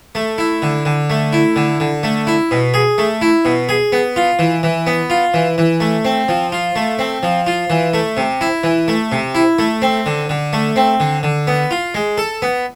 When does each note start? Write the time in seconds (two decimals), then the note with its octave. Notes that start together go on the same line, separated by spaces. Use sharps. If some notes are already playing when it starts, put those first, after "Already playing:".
0.15 A3
0.38 E4
0.62 D3
0.85 D3
1.10 A3
1.33 E4
1.56 D3
1.80 D3
2.03 A3
2.27 E4
2.51 B2
2.74 G#4
2.98 A3
3.22 E4
3.45 B2
3.69 G#4
3.92 B3
4.16 F4
4.39 E3
4.63 E3
4.87 B3
5.10 F4
5.34 E3
5.58 E3
5.80 A3
6.05 C4
6.29 F3
6.52 F4
6.76 A3
6.99 C4
7.23 F3
7.47 F4
7.70 E3
7.94 A3
8.17 C3
8.41 E4
8.64 E3
8.88 A3
9.12 C3
9.35 E4
9.59 A3
9.82 C4
10.06 D3
10.29 D3
10.53 A3
10.76 C4
11.00 D3
11.23 D3
11.47 B3
11.71 F4
11.95 G#3
12.18 A4
12.42 B3